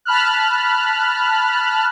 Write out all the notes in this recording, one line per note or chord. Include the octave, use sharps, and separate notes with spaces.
A5 B5 F6 F#6